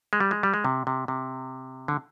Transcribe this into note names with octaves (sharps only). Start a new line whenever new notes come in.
G#3
G3
G#3
G3
G#3
C3
C3
C3
D3